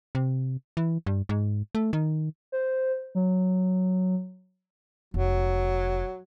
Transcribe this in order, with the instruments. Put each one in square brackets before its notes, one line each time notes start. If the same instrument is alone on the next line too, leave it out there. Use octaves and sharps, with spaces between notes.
[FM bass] C3
E3
G2
G#2
A3
D#3
[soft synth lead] C5
F#3
[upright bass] F1 [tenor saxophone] F#3